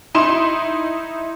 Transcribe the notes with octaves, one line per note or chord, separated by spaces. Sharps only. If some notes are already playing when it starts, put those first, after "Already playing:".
D#4 E4 C6 E7